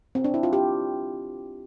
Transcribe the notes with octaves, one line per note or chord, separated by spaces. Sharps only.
C4
D4
E4
F4
G4